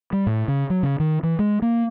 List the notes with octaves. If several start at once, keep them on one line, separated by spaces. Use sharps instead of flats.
G3
A2
C#3
F#3
C#3
D#3
E3
G#3
A#3